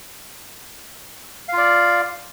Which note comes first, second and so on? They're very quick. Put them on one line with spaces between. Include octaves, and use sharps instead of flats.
F5 F4 D5